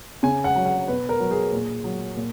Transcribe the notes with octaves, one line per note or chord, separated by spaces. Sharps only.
C#3 G#5
F#5
F#3
F#5
B2 B4
A#4
F#3
G#4
A#2
F#3
A#2